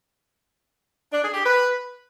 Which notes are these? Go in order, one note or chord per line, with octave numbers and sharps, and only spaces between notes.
D4
G#4
G4
B4